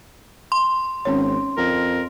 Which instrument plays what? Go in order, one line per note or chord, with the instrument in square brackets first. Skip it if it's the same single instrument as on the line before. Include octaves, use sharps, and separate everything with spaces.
[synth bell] C6
[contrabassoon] G#1 [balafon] C#4 C#5
[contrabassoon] F2 [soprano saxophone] A#4